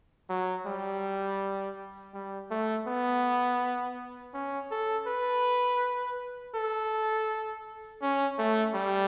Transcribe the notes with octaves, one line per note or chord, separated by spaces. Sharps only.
F#3
G3
G3
A3
B3
C#4
A4
B4
A4
C#4
A3
G3